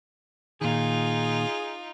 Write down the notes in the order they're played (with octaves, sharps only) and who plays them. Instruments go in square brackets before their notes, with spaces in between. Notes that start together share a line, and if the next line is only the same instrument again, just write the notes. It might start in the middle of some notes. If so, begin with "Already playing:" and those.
[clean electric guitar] A#2 D#3 [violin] D#4 F4 [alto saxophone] G#4